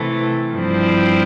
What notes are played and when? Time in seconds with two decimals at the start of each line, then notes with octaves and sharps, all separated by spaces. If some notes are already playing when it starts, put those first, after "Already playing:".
Already playing: C3 E3 A3
0.55 G2 F3 C4 E4